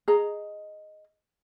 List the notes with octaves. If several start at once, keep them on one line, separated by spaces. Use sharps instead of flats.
G#4 D#5 A#5